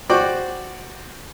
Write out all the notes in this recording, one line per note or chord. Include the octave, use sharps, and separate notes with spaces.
F#4 C5 D5 G5 D6